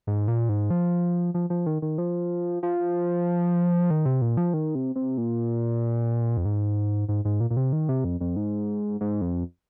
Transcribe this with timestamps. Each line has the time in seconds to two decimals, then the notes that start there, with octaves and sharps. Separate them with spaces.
0.07 G#2
0.28 A#2
0.49 G#2
0.70 F3
1.34 F3
1.50 F3
1.66 D#3
1.82 D#3
1.98 F3
2.63 F3
3.90 D#3
4.05 C3
4.22 A#2
4.37 F3
4.54 D#3
4.75 C3
4.96 C3
5.18 A#2
6.37 F2
6.45 G#2
7.09 G#2
7.25 G#2
7.40 A#2
7.50 A#2
7.57 C3
7.73 D#3
7.89 C3
8.04 F2
8.21 F2
8.36 G#2
9.01 G#2
9.21 F2